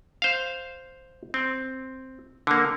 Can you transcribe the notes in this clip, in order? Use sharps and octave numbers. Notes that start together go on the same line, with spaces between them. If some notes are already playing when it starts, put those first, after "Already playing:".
C5 F5
C4
D3 A#3